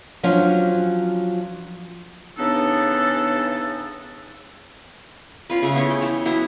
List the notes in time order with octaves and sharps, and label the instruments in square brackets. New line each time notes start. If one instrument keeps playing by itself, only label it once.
[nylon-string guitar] F3 F#3 C#4 D4 F4
[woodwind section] C#3 E3 B3 D4 D#4 A4
[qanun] C#4 F4 B4
C#3 A3
B3 E4 C#5
G5
E3
F#3 B3 E4